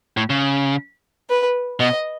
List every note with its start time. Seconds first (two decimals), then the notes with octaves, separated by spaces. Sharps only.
0.17 A2
0.30 C#3
1.29 B4
1.80 B2 D#5